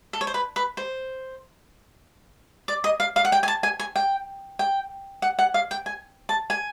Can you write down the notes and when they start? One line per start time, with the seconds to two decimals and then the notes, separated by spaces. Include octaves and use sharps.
0.13 A4
0.21 C#5
0.27 C5
0.34 B4
0.56 B4
0.77 C5
2.68 D5
2.84 D#5
3.00 F5
3.16 F5
3.25 F#5
3.32 G5
3.43 G#5
3.48 A5
3.63 G#5
3.79 G#5
3.96 G5
4.59 G5
5.22 F#5
5.39 F#5
5.54 F5
5.71 G5
5.86 G#5
6.29 A5
6.50 G#5